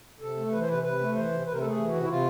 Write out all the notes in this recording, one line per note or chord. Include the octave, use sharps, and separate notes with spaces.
C3 A4
A3
E3 B4
C5
C3 B4
C3 B4
A3
E3 C5
C3
C3 B4
A#4
A3 A4
G#4
E3
F#4
C3
E4
C3 F4